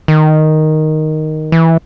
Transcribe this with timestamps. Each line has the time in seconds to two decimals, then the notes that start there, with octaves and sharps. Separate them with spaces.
0.08 D#3
1.52 E3